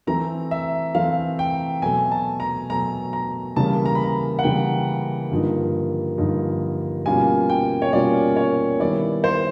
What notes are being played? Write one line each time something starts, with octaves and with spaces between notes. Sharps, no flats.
E3 A3 C4 A#5
E5
E3 A3 C4 F5
G5
B2 F#3 A3 G#5
A5
A#5
B2 F#3 A3 A#5
A#5
C#3 E3 G3 A#3 A5
A#5
B5
A#5
F#5
C#3 E3 G3 A#3 G5
G2 D3 F3 A#3 D#4
G2 D3 F3 A#3 D#4
B2 G3 A#3 C#4 F4 G#5
G5
C#5
B2 G3 A#3 C#4 F4 D5
C#5
D#3 G3 B3 E4 D5
C5